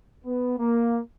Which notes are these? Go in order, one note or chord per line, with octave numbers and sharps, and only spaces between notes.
B3
A#3